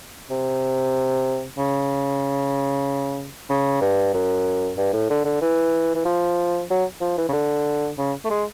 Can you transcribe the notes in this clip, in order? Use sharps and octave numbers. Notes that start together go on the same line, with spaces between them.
C3
C#3
C#3
G2
F#2
G2
A2
D3
D3
E3
E3
F3
F#3
F3
E3
C#3
D3
C#3
A3
G#3